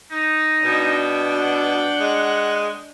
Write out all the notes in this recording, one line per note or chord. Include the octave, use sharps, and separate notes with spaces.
D#4
B2 D4 G5
F#5
G#3